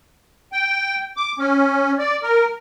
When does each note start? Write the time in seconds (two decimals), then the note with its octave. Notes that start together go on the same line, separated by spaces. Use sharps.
0.52 G5
1.17 D6
1.39 C#4
1.99 D5
2.23 A#4